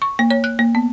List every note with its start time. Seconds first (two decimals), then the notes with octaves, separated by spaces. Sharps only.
0.02 C#6
0.19 A#3
0.31 C#5
0.44 F#6
0.59 A#3
0.75 B3